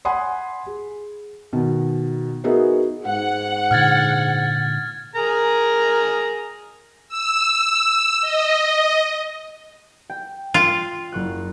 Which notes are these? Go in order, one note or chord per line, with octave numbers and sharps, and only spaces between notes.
F#5 G#5 B5 C6 D#6
G#4
B2 D#3
B3 D#4 F#4 G#4 A#4 E5
G#2 F#5
A#2 D3 F6 G#6 A6
G#4 A#4 A#5
E6
D#5
G5
F4
F#1 C#6 F#6